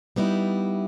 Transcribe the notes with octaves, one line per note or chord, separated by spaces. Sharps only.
G3 B3 D#4 E4